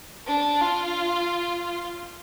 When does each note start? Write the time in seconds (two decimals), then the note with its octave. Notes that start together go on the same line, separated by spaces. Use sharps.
0.27 D4
0.60 F4